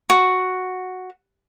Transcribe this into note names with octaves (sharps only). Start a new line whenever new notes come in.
F#4